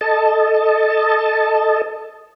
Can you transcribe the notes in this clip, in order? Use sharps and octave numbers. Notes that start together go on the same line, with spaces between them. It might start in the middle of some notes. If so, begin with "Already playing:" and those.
A4 D#5 A5